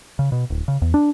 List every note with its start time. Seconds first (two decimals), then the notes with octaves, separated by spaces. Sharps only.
0.19 C#3
0.32 B2
0.50 D1
0.68 C#3
0.82 E2
0.94 D4